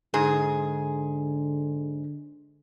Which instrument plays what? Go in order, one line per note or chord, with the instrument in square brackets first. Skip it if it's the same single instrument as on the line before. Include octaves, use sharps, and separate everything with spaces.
[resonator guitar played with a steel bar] G#2 G#4 [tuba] D3